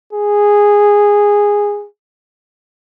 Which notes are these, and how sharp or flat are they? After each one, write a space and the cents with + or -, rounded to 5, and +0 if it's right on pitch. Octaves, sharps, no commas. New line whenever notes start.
G#4 -10